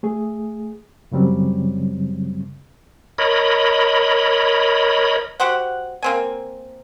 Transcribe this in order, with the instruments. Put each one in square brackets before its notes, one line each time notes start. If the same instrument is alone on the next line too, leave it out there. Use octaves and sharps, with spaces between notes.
[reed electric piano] A3 G#4
F#2 C#3 F#3 G3 C4
[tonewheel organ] A#4 C#5 D#5 B5
[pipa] F#4 G4 C5 F#5
A#3 C4 G#5